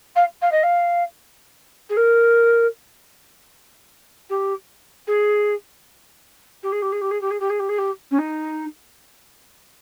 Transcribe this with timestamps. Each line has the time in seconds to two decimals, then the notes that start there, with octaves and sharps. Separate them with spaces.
0.15 F5
0.41 F5
0.51 D#5
0.63 F5
1.89 G#4
1.96 A#4
4.29 G4
5.07 G#4
6.62 G4
6.71 G#4
6.82 G4
6.92 G#4
7.01 G4
7.10 G#4
7.21 G4
7.30 G#4
7.39 G4
7.49 G#4
7.59 G4
7.68 G#4
7.78 G4
8.11 C#4
8.18 D#4